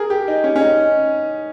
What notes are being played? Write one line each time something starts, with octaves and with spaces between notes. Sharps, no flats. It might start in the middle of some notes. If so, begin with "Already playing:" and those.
Already playing: G#4 A#4
G4
D#4
C#4
C#4
D#4